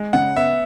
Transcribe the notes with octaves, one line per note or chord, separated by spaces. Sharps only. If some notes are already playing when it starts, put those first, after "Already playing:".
Already playing: G#3
C#3 F#5
B3 E5